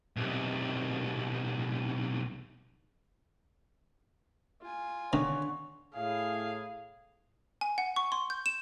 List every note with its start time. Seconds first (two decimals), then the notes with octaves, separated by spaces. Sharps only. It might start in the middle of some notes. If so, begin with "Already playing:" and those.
0.17 B1 C3
4.62 F4 G#5
5.13 D3 D#3 C#5
5.94 A2 G#4 F5
7.61 G#5
7.78 F#5
7.96 C#6
8.12 C6
8.30 G6
8.46 E7